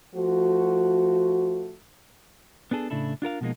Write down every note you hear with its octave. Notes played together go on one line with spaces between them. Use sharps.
F3 A3 F#4
B3 D4 G#4 A4
A2 C#3 D4 E4 A4
D4 F4 A#4 F5
B2 F3 G#3 A#3 D#4